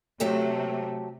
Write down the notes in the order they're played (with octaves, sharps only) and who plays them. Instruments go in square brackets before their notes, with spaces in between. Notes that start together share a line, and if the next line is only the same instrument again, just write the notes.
[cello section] C3 A3 [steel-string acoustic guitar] F#3 G4 A4